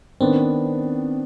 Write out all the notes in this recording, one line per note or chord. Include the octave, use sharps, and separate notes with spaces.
D#3 B3 C4 D4